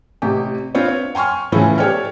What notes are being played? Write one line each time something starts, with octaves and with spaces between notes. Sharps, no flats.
A1 C3 G4
C4 D4 F4 B4 C#5 D5
C#5
G5 G#5 C6 C#6 F6
A2 C#3 E3 F3 C#4 E4
G4 A4 C#5 D5 G5 F6